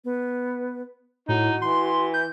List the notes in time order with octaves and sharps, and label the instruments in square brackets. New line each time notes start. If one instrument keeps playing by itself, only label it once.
[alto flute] B3
[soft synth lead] A2 [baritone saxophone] D#4 [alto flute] F#4
[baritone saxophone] E3 [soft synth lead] C6
[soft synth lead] G6